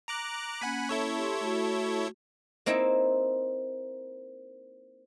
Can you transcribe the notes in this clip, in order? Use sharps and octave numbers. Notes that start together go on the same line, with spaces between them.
A#5 D6 F#6
A#3 C#4 F#5 G#5 B5
E4 A4 C#5
G4 C6
A3 F#4
A#3 C4 D#4 E4